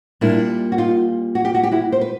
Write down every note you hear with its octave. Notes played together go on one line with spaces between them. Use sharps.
A#2 G3 A#3 D4 E4
F#4
D#4 F4
F#4
G4
F#4
G4
E4 F#4
C5
B4